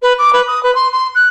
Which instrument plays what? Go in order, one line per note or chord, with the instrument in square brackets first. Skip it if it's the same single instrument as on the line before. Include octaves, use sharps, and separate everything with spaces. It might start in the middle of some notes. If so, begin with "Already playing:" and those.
[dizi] B4
D6
B4
D#6
B4
C6
C6
F#6